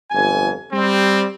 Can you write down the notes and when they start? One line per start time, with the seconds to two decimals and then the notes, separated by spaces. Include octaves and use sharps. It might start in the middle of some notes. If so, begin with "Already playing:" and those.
0.11 G1 F2 G#5
0.73 G3 C4